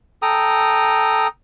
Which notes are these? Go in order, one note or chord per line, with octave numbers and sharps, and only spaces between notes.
A4 G5 A#5 D#6